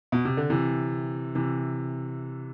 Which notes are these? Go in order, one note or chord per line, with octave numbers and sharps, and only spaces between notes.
B2
C3
D3
C3 E3
C3 E3